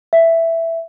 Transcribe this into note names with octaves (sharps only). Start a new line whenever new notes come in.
E5